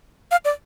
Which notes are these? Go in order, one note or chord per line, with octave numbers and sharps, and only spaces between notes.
F5
D5